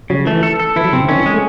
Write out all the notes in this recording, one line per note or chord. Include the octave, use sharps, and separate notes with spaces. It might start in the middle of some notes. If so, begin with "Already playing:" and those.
C#3 F#3
E3 A3
A4
A4
E3 E4
F#3
C3 C4
C#3
D#3 C#4
E3
G#3
A3